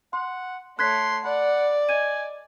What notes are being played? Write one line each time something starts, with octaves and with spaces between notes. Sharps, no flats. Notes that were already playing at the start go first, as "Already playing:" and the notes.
F#5 C6
A3 C#5 C6 F#6 G#6 B6
D5 F#5 B5
D#5 G#5 G#6 D#7